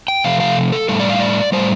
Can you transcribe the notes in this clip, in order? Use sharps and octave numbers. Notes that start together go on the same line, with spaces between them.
G5
C3 F3 A3 F5
F5
A4
A2 G3 A4
D5
F5
D5
A2 G3 C5